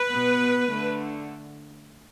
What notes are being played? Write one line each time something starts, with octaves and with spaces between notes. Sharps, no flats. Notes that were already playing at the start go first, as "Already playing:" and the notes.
Already playing: B4
B2 B3
D3 A3